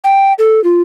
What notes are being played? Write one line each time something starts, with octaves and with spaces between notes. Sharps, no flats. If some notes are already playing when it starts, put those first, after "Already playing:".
G5
A4
F4